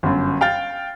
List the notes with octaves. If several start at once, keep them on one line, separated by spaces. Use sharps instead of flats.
G1 F#2
F5 G5 F6 A6